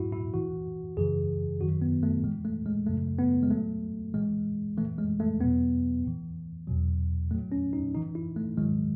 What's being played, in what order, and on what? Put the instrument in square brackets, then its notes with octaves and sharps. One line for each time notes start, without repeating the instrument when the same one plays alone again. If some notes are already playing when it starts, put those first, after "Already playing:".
Already playing: [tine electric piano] G#2 F#3 E4 F#4
E4
A2 E3 F#4
F#2 C#3 E3 G#4
F#2 D#3 F#3 F#4
B3
A3
A2 E3 G#3
A3
G#3
F#2 C#3 F#3 A3
B3
G#3
A2 F#3 A3
A2 E3 G#3
E3 A3
A2
G#3
A3
E2 B2 F#3 B3
A2 E3
E2 B2 F#3
A2 A3
F#3
C#4
D#4
A2 E3 D#4
E4
A3
G#2 D#3 F#3 G#3